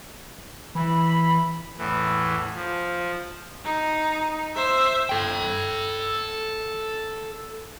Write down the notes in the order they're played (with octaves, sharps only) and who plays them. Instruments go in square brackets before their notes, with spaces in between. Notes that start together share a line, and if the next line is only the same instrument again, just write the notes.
[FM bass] E3 [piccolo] B5
[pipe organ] E2 A2 E3
F3
[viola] D#4
C5 E5
[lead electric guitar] A4 G5